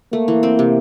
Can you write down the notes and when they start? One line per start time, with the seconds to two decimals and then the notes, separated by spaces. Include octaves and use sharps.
0.13 A3 A#3
0.28 E3
0.43 C4
0.59 C3